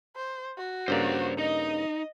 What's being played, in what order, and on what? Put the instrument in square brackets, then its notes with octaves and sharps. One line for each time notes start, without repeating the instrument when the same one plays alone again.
[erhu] C5
F#4
[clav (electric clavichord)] G2 C#3 A#3 [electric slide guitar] C5 D5
[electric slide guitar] D#4 [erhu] D#5